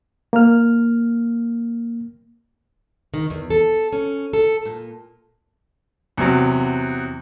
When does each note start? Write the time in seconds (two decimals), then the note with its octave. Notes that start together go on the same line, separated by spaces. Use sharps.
0.33 A#3 F6
3.14 D#3
3.30 E2
3.50 A4
3.93 C#4
4.33 A4
4.65 A#2
6.18 E2 C3 F#3